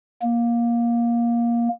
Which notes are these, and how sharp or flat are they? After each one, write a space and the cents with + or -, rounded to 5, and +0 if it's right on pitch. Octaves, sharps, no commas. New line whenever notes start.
A#3 +15